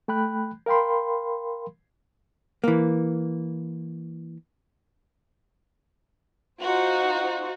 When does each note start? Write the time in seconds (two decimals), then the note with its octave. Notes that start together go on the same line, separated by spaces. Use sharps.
0.08 A3 G5 B5 F#6
0.66 A#4 F5 G5 B5 C6
2.64 E3 A#3
6.61 D#4 F4 F#4 C5